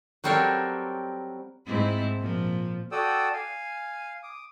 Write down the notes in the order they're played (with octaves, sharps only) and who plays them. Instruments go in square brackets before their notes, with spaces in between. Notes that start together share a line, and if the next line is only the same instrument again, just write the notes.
[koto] F#3 G3 C4 A4 A#4 C#5
[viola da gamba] G#2 C4 E4
A#2 F3
[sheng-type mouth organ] F#4 A4 D5 G5 D#6 E6
F5 G#5
D6 D#6